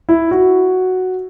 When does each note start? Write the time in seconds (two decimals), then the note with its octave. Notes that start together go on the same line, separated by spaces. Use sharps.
0.09 E4
0.31 F#4